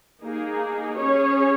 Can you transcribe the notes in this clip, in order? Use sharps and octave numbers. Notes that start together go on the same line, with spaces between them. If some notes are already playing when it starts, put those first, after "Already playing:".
A#3 D#4 G#4
C#4 G#4 C#5